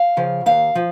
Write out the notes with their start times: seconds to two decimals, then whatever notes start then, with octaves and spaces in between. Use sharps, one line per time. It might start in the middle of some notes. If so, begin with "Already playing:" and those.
Already playing: F5
0.17 C#3 F3
0.46 D#2 F5
0.75 F3